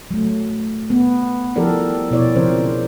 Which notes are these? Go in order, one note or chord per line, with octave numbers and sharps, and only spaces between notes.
F#3 A3
B3
F3 E4 G4 A4 A#4 D5
B2 E4 C#5 D5
C#3 F3 C4 A#4 C5